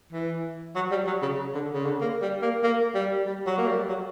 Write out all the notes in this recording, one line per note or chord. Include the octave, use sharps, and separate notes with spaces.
E3
F#3
G3
F#3
C#3
D3
C#3
D3
A#3
G3
A#3
A#3
G3
G3
F#3
A#3
G3
F#3